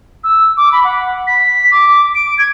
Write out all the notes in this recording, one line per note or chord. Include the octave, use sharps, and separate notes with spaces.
E6
D6
B5
F#5
B6
D6
D7
G#6